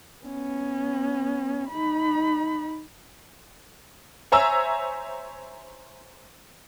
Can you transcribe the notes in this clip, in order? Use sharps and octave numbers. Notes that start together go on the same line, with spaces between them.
B3 C#4
D#4 B5
C5 C#5 E5 G#5 A#5 E6